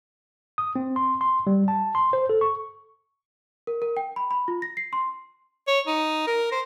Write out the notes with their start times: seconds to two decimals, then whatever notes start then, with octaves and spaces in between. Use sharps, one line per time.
0.58 D#6
0.76 C4
0.96 C6
1.21 C6
1.47 G3
1.68 A5
1.95 C6
2.13 C5
2.29 A4
2.41 C#6
3.67 A#4
3.82 A#4
3.97 G5
4.16 B5
4.31 B5
4.48 F4
4.62 A#6
4.77 C7
4.93 C6
5.68 C#5
5.87 D#4
6.27 A#4
6.52 C5